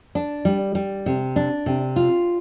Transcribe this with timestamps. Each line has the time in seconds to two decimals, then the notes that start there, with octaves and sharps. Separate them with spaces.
0.15 D4
0.45 G3
0.75 G3
1.06 C3
1.36 D4
1.66 C3
1.96 F4